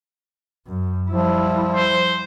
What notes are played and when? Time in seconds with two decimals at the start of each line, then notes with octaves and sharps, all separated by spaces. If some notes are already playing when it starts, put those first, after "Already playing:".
0.67 F#2
1.10 F3 G3 E4
1.75 C5